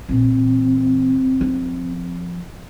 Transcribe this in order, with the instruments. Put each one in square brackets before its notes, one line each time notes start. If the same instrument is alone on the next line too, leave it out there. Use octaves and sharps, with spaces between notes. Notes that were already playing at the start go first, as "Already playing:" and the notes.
[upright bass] A#2 E3 [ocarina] C4
[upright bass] F3